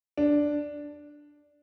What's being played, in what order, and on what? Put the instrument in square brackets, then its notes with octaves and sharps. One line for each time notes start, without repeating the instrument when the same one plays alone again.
[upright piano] D4